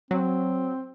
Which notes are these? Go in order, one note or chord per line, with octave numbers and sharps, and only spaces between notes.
F#3 C4